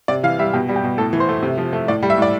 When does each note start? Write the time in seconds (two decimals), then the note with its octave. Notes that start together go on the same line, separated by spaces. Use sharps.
0.08 C3 D5
0.23 E3 F5
0.39 G3 E5
0.53 B2 G4
0.69 G3
0.76 G4
0.84 B2
0.98 A2 A4
1.13 E3
1.20 C5
1.29 A3
1.43 C3
1.58 F3
1.73 A3
1.88 A2 D5
2.03 G3
2.10 E5
2.18 A2 D5